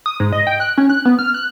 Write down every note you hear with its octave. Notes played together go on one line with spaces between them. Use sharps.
D#6
G#2
D#5
G5
F#6
C#4
F#6
B3
F6
F#6